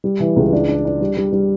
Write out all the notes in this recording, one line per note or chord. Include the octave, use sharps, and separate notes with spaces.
G3
E3
C#2
D4
D4
D4
G3
G3
G3